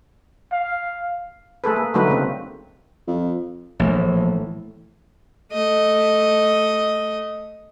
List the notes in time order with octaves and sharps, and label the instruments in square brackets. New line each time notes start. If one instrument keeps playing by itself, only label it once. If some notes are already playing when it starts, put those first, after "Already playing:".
[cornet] F5
[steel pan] A3 G#4 A4 B4
A#3
D3 F#3 A3 D#4 F#4 B4
C#3 G#3 A#3 C4
[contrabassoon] F2
[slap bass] A#1 [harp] A2 E3 B3
[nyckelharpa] A3 D#5